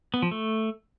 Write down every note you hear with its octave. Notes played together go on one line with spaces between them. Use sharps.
B3
F3
A3